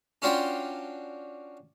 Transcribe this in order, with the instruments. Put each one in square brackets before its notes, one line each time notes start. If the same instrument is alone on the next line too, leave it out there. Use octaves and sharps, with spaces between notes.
[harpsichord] C#4 D4 F4 F#4 G5 C6